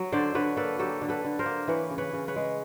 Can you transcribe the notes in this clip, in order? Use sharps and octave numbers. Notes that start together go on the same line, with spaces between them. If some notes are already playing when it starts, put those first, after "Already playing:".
Already playing: F#3
D3 C5 D5
D3 B4 C#5
A#3 A4 B4
F#3 G4 A4
D3
A4 B4
D3
A#4 C5
A#3
E3 B4 C#5
C#3
B4 C#5
C#3
B4 C#5
G#3